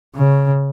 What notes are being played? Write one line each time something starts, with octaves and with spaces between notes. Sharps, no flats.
C#3